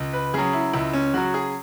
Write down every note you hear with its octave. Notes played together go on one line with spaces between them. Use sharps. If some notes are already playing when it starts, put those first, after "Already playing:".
Already playing: C#2
B4
C#3 F#3 G#4
E4
C#2 E4
C#4
C#3 F#3 F#4
G#4